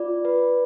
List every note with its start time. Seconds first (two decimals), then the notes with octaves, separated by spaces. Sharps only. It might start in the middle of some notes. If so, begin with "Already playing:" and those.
Already playing: F4 D5
0.25 B4